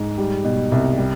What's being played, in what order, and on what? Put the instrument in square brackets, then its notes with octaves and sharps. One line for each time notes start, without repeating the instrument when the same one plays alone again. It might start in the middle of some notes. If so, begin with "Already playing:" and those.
Already playing: [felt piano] G#2
G3
B2
C2
G3